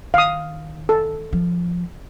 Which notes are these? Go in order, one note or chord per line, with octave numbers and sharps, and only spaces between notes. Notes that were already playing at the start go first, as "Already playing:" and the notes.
D#3 F5 D#6
A4
F3